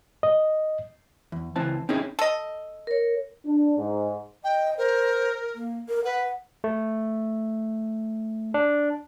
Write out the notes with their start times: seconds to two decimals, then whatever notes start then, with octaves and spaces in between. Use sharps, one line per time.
0.23 D#5
1.32 E2
1.56 C#2 E3 C4 A5
1.89 C4 C#4 D#4 E4 G#4
2.19 A4 D#5
2.87 A#4 C#5
3.46 D4
3.78 G#2
4.44 D#5 G5
4.78 A#4 C5
5.55 A#3
5.89 A#4
6.05 B4 F#5
6.64 A3
8.54 D4